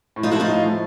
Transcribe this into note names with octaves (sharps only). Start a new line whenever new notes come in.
A2
D#4 F4
F3 A3 D#4 E4 F4 F#4
A2
F3 A3